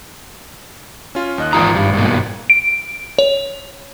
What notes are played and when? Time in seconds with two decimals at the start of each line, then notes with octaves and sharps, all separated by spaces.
1.15 C#4 F4
1.38 D#2 D#5 F#6
1.53 G#1 E3 F4 A#5 D#6
1.75 G2
1.94 G2 B2 A#3
2.50 D7
3.19 C#5